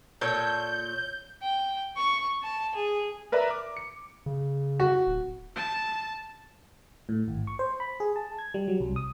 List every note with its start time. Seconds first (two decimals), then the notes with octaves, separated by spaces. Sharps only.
0.21 A#2 A4 C#5 G6
1.42 G5
1.97 C#6
2.43 A5
2.75 G#4
3.32 A#4 B4 D5 E5 A#5
3.50 D6
3.77 C#7
4.26 C#3
4.80 F#4
5.07 D1
5.56 A5
7.09 A2
7.28 G#1
7.47 C#6
7.59 C5
7.80 B5
8.00 G#4
8.16 A5
8.39 G#6
8.54 G3
8.68 F#3
8.80 C2
8.96 D#6